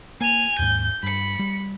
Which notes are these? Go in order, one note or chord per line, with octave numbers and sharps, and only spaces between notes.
A#3 G#5 F7
D#2 G#2 G6
G2 B5 C#7
G3